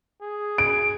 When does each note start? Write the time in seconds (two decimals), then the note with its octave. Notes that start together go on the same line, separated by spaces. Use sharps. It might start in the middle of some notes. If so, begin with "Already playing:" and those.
0.22 G#4
0.58 D7